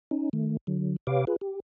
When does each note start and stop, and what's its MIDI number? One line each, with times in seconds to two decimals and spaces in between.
0.11 0.29 61
0.11 0.29 63
0.33 0.57 51
0.33 0.57 57
0.67 0.96 50
0.67 0.96 54
1.07 1.25 48
1.07 1.25 67
1.07 1.25 71
1.07 1.25 73
1.07 1.25 77
1.07 1.25 86
1.27 1.36 65
1.27 1.36 68
1.27 1.36 71
1.41 1.60 67